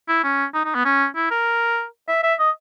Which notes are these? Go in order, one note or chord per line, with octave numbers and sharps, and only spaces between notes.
E4
C#4
D#4
D#4
B3
C#4
E4
A#4
E5
E5
D#5